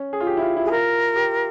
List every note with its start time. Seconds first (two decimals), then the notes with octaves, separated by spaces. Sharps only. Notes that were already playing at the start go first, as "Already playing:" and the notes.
Already playing: C#4
0.13 G#4
0.20 F4
0.27 G4
0.37 E4
0.42 F4
0.57 E4
0.66 G#4
0.71 F4 A#4
1.16 G4